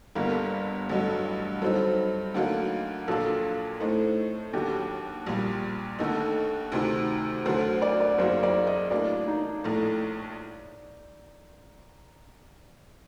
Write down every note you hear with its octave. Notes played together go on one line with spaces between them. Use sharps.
G1 G2 D3 G3 A#3 A#4
A1 G2 D3 F#3
G2 F#3 C4 D#4 A4
D2 D3 F#3 A#3 D#4
A#1 A#2 F#3 A#3 D4 A4
A2 A3 C4 D#4
D#2 D3 F#3 G4
A#1 A#2 G3
D#2 D3 A3 D#4 A4
D2 C3 D#3
D2 D3 F#3 C5
D5
D5
F#1 F#2 F#3 A#3 D#4 C5
D5
D#5
A2 F#3 A#3 D4 D5
D#4
A#1 A2 A3